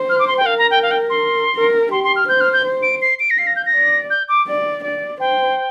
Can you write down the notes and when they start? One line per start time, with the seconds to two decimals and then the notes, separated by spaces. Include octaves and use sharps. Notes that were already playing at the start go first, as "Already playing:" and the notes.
Already playing: C5
0.09 F6
0.19 D6
0.27 C6
0.37 G5
0.46 A#4 F5
0.58 A#5
0.71 G5
0.82 F5
0.91 G5
1.10 C6
1.55 A#4
1.91 G4 C6
2.04 C6
2.16 F6
2.28 C5 G6
2.41 F6
2.53 G6
2.65 C5
2.82 D7
3.02 C7
3.20 D7
3.30 A#6
3.38 F5 C7
3.47 A#6
3.56 G6
3.66 A#6
3.74 D5
4.10 G6
4.29 D6
4.47 D5
4.84 D5
5.20 C5 G5